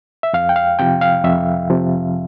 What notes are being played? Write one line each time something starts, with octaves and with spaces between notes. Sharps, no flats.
E5
F2 F5
G5
F5
C3 F3 G5
F5
F2 E5
C3 F3